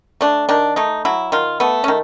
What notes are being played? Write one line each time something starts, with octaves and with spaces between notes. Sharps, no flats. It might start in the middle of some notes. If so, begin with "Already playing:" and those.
A3 D4
D#3 D4
A3 D#4
F#3 E4
D#3 F4
A3 B3
C#4
D#3